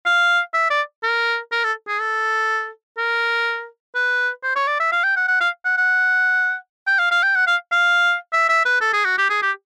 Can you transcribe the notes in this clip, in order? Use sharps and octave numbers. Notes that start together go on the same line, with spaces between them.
F5
E5
D5
A#4
A#4
A4
G#4
A4
A#4
B4
C5
C#5
D5
E5
F5
G5
F#5
F#5
F5
F#5
F#5
G5
F5
F5
G5
F#5
F5
F5
E5
E5
B4
A4
G#4
F#4
G4
G#4
G4